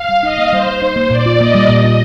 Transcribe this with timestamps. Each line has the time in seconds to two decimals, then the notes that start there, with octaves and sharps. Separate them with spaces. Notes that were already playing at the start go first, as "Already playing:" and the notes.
Already playing: F5
0.09 G3
0.23 D#4 D#5
0.38 A#3
0.52 G3 C5
0.66 G3
0.81 D#4 C5
0.96 A#3
1.10 A#2 D5
1.26 F4
1.39 A#3 D#5
1.54 G3
1.69 A#2 D#5
1.84 F4